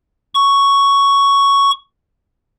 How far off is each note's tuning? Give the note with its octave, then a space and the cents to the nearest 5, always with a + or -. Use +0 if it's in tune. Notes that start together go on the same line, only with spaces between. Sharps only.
C#6 +5